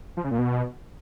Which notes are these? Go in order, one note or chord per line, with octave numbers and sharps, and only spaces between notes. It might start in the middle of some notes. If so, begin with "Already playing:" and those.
F3
C#3
A#2
B2